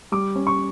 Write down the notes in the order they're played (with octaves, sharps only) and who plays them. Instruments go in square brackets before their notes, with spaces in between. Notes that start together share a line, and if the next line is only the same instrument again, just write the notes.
[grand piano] G3 D6
C#4
C#6